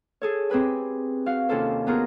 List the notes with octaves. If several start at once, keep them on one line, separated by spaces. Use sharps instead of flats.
G#4 A4 C#5
C4 G4 G#4 B4 G#5
F#4 F5
D#2 C3 C#4 F4 A4 C5
B3 D#4 F4 F#4 G#4 A#4